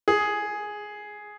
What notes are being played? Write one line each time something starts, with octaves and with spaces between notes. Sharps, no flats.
G#4